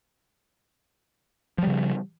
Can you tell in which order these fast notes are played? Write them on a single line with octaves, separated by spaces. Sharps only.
F3 G3 C#3